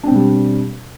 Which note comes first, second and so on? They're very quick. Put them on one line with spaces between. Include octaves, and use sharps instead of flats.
D4 C4 B2 G3